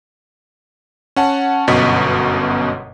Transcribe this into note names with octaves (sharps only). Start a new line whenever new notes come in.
C#4 F#5 A5
G1 F#2 B2 D#5 C#6 B6